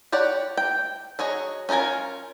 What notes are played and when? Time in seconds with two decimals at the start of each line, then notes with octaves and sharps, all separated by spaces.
0.12 G4 C#5 D5 F#5
0.57 G5
1.19 F#3 G#4 C#5 D#5
1.69 C#4 D#4 F4 A#4 G#5